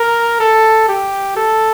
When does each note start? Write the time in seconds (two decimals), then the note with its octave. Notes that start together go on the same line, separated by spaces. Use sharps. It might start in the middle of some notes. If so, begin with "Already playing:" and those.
Already playing: A#4
0.40 A4
0.88 G4
1.36 A4